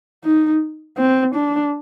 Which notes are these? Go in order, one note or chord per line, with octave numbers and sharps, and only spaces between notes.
D#4
C4
D4